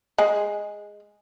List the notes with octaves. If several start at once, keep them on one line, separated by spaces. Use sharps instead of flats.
G#3 G#4